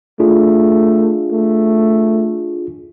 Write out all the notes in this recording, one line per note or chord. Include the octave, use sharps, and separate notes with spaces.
A3 D4 F4 G#4
A3